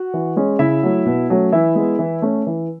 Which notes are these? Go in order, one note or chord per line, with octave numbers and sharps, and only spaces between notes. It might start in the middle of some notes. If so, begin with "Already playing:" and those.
Already playing: F#4 F#5
E3
G#3 C#4
C#3 E4 E5
F#3 A3
B2
F#3 A3 C#4
E3 E4 E5
G#3 B3
E3
A3 C#4
E3